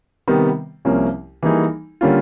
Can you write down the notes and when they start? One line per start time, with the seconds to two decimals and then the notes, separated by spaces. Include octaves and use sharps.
0.28 C3 D#3 G3 B3
0.85 C2 C3 F3 A#3 C#4
1.43 E3 G3 A#3 D#4 G#4
2.01 D3 G3 A#3 C#4 F4